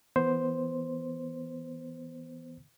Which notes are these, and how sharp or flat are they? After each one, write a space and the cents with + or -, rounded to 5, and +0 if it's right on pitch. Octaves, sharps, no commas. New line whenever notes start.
E3 +0 B3 +0 C5 +0